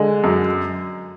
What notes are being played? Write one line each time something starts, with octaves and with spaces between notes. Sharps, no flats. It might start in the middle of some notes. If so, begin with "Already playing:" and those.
Already playing: D3 G#3
F#2